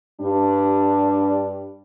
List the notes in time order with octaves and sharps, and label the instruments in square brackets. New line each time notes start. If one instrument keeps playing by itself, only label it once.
[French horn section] G2 G3 D4